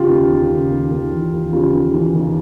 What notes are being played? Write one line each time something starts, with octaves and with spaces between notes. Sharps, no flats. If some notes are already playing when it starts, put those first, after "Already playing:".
Already playing: C#3 F4 G4
D#2
D#2
C#3
D#2
D#2
E3
D#2
C#3 F4 G4
D#2
E3
D#2